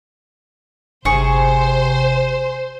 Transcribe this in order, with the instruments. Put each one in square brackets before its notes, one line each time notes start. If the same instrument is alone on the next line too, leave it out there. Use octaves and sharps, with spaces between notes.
[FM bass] G1 [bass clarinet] C3 [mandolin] G#4 C#6 [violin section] C5